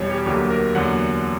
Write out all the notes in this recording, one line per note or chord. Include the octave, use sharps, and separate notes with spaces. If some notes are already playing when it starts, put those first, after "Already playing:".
Already playing: E2 B2 G3 C#5
G4
D2 D3 F#3 A#3 G4
A#4
E2 D3 F#3 A#3 F#5